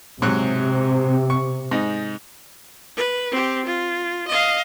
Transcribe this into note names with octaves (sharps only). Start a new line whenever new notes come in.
G#2 C3 F#3 F#6
C#6
G#2 D#4
B4
C4 G4
F4
D#5 F5